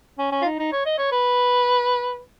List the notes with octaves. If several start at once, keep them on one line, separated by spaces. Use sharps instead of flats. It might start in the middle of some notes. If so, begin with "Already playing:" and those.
C#4
C#4
F4
D#4
D#4
C#5
D#5
C#5
B4